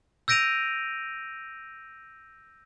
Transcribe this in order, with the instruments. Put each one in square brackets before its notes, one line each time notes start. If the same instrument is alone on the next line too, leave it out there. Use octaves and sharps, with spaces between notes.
[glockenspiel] E6 G6 A#6 D7 D#7 F7